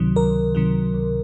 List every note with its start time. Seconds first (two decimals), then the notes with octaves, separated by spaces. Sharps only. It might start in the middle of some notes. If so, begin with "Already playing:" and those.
Already playing: C#2 C3 D#3 F#3
0.16 C#2 A#4
0.55 C3 D#3 F#3
0.94 C#2